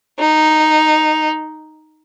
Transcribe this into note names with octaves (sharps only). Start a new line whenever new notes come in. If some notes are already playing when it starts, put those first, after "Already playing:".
D#4